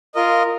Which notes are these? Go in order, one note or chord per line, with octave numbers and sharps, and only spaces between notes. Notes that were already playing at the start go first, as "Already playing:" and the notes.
F4 A#4 D#5